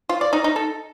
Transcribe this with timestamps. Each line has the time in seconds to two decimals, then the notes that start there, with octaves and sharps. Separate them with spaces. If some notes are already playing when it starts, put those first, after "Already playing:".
0.09 F4
0.21 D5
0.33 D#4
0.44 D#4
0.56 A4